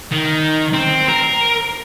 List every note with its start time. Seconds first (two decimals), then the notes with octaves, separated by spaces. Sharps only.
0.12 D#3
0.74 C4
1.09 A#4